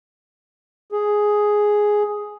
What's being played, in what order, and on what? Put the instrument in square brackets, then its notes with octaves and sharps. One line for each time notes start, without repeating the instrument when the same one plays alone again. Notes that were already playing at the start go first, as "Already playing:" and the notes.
[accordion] G#4